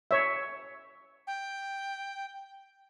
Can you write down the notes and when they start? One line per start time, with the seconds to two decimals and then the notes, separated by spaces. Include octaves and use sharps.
0.11 C#5 E5
1.27 G5